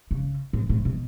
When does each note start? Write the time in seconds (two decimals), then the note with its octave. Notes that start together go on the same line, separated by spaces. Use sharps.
0.11 C#3
0.53 A2
0.69 A2
0.85 B2